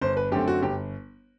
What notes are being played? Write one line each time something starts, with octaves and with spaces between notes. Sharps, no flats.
G1 C5
B4
F#2 D3 A3 C4 G4
F#4
G1 G4